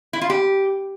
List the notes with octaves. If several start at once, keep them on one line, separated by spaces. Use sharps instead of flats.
E4
F4
G4